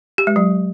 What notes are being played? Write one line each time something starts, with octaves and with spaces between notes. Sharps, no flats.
G4
G#3
F#3